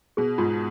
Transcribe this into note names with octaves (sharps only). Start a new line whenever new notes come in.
B2 G#4
G#2 F4